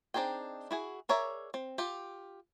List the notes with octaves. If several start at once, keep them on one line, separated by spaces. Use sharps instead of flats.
C4 D4 D#4 G#4 G5
E4 F#4 G#4
G#4 A#4 C#5 D5 E5
C4
F4 G4